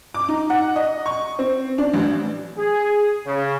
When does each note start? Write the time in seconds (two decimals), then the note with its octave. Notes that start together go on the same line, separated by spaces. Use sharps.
0.14 D6
0.29 D#4
0.50 F#5
0.76 D#5
1.06 C#6
1.39 C4
1.78 D4
1.93 A1
2.56 G#4
3.25 C#3